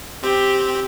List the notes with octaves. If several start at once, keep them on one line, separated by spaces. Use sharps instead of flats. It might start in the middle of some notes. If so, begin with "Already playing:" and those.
C4 G4